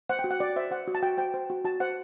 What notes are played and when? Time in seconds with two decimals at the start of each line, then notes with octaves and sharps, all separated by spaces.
0.09 C5 F#5
0.19 G5
0.24 F#4
0.31 F#5
0.40 F#4 D5
0.56 C5 E5
0.71 C5 F#5
0.88 F#4
0.95 A5
1.02 F#4 G5
1.18 C5 G5
1.34 C5
1.50 F#4
1.65 F#4 A5
1.80 C5 F#5